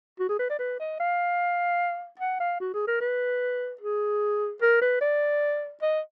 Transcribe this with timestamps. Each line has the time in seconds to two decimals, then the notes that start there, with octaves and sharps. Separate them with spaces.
0.20 F#4
0.29 G#4
0.39 B4
0.50 D5
0.59 B4
0.80 D#5
1.00 F5
2.19 F#5
2.40 F5
2.60 F#4
2.74 G#4
2.87 A#4
3.01 B4
3.81 G#4
4.62 A#4
4.81 B4
5.01 D5
5.82 D#5